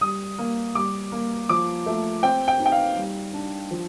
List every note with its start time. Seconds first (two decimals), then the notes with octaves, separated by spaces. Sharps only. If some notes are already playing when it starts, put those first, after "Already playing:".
0.01 G3 D#6
0.39 A#3
0.75 G3 D6
1.12 A#3
1.49 F3 D6
1.86 A3
2.23 C4 G5
2.48 G5
2.60 D#4
2.66 G5
2.72 F5
2.96 G3
3.34 D4
3.71 F3